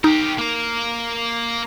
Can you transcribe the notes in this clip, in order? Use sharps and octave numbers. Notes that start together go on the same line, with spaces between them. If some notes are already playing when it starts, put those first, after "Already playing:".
D#4 G4 A#4
A#3 A#4